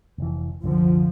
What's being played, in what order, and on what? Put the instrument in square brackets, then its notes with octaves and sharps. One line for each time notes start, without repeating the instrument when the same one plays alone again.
[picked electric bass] F1 E3
[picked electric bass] C2 F#2 D3 [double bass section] F3